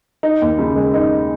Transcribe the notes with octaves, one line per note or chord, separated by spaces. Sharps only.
D#4
D#2
C#3
G#3
D#4